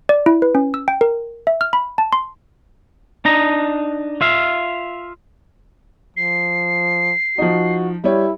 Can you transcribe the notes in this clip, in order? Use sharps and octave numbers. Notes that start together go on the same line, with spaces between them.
D5
E4
B4
C#4
E6
G5
A#4
E5
F6
B5
A5
C6
D4 D#4 A#5
F4 E5 F5
F3 C7
F3 D#4 F#4
G3 E4 C#5